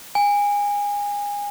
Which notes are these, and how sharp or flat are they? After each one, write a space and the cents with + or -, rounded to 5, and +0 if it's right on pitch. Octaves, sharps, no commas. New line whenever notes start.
G#5 -25